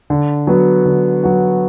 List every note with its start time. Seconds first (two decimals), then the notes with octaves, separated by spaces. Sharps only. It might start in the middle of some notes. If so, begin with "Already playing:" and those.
0.10 D3
0.47 F#3 B3 F#4
0.85 D3
1.23 F#3 B3 F#4